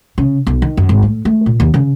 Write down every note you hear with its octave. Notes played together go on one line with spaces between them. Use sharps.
C#3
B1
D#3
F#2
G#1
A2
A3
A#2
D#2
C#3